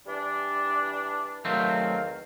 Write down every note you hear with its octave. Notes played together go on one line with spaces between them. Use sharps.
E3 G3 D4
E2 D#3 F#3 A3 C4 F5